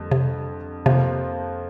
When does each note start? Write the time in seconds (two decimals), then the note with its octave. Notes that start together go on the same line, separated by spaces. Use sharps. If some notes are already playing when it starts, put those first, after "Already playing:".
Already playing: F2 D3 G3 A#3
0.11 C3
0.86 F2 C3 F3 A#3 G4